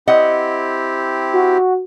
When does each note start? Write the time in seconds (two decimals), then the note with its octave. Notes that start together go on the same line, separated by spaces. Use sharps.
0.07 C4 E4 G4 D#5 F#5
1.33 F#4